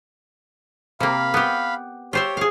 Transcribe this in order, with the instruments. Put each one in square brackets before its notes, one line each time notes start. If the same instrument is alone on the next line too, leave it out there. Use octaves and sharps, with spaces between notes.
[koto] C3 A#3 [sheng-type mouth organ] F5 B5
[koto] B3 G4
[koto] F4 C5 E5 [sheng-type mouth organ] G4 C#5
[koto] G#4 F5